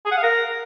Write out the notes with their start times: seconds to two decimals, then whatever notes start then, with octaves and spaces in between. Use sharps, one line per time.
0.06 G#4
0.11 F#5
0.17 F5
0.23 A#4